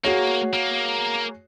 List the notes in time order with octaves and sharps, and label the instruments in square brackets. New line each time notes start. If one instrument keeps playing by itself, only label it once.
[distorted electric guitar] A#3 [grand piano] F#4 G#4 C#5
[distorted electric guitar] A#3